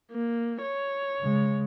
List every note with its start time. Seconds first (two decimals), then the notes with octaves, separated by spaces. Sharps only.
0.11 A#3
0.62 C#5
1.20 C#3 G#3